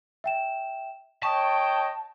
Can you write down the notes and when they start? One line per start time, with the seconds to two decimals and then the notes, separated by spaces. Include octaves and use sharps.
0.24 E5 G5 E7
1.23 C#5 D#5 G5 A5 C#6